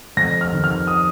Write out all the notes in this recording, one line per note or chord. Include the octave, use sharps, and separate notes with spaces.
F2 A#6
F6
D#3
F6
D#6